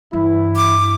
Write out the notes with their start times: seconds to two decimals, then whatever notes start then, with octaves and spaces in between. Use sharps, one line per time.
0.13 G2 E3 E4
0.56 D6